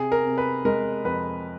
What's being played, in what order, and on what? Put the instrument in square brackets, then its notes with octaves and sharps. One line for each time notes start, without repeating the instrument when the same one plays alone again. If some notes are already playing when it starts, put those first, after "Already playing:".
Already playing: [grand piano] C3 G#4
A#4
C3
B4
G#3 A#4
F2 B4